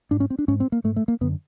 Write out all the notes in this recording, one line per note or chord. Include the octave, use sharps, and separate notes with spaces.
G#2 D4
C#4
C4
D4
G#2 C#4
C4
A#3
G#2 A3
A3
A#3
F#2 D3 B3